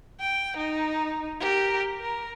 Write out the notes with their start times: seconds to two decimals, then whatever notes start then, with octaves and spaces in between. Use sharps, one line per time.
0.20 G5
0.57 D#4
1.40 G4 A#4
2.00 A#4